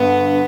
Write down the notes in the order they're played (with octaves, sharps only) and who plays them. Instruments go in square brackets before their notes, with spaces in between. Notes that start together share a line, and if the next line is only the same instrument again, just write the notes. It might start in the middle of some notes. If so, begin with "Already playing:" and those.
Already playing: [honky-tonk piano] G2 D3 [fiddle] B3